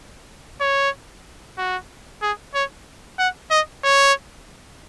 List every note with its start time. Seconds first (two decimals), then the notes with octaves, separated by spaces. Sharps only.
0.61 C#5
1.58 F#4
2.22 G#4
2.54 C#5
3.19 F#5
3.51 D#5
3.84 C#5